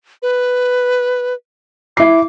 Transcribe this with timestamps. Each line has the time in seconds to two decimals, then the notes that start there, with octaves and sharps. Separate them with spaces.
0.22 B4
1.97 E4 D6 C7